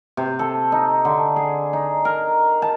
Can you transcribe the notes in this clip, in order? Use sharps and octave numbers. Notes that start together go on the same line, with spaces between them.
C3
A4
D#4
D3
G#4
D#4
A#4
A5